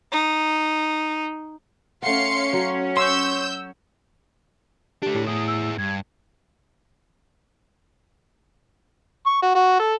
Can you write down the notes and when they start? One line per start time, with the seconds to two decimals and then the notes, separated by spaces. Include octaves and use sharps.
0.12 D#4
2.02 A3 C#4 C#5 F5 F#5 C6 C#7
2.53 F#3
2.97 C6 C#6 E6 G6
5.02 A3 D4 G4
5.15 A2
5.27 E4 G#4 D#6
5.48 E6
5.78 G2 G#6
9.26 C#6
9.42 F#4
9.55 F#4
9.79 A4